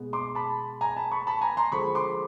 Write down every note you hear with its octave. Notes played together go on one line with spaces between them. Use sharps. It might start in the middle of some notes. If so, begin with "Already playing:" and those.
Already playing: B2 G#3 B3
C6 D6
A5 B5
G#5 A#5
A5 B5
B5 C#6
A5 B5
G#5 A#5
A#5 C6
D3 F3 G#3 B5 C#6
C6 D6